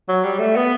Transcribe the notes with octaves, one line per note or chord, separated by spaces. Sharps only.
F#3
G3
A3
B3